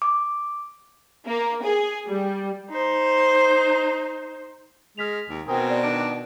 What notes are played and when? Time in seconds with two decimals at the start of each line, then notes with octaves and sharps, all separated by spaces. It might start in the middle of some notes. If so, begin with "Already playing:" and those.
0.02 D6
1.27 A#3
1.64 G#4
2.08 G3
2.70 D#4 C5
4.98 G#3 F6 B6 F7
5.29 D#2
5.48 B2 C4 A#4 G5 G#5 D#6
5.70 D5
5.83 D#3 D4 D7